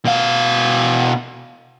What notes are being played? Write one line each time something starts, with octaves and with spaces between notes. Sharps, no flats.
B2 F5